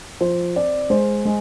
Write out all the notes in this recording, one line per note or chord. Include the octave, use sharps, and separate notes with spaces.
F3 C5
C4 D5
G#3 C5
G#3